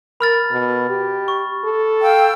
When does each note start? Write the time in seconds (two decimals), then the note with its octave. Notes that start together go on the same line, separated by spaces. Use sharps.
0.21 A#4 B5 F6 A6
0.51 B2
0.89 G4
1.28 C#6
1.64 A4
2.01 F5 G5 E6